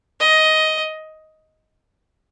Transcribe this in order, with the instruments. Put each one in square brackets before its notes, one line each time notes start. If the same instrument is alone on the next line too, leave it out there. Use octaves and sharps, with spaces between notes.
[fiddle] D#5